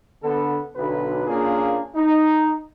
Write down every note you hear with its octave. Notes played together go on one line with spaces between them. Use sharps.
D3 B3 A4
B1 D3 B4
A#2 A#3 C#4 D4 F4 G#4
D#4